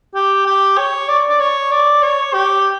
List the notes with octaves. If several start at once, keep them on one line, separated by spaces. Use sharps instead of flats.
G4
G4
C#5
D5
D5
C#5
D5
C#5
G4